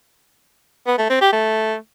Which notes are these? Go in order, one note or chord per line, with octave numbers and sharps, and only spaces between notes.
B3
A3
C4
G4
A3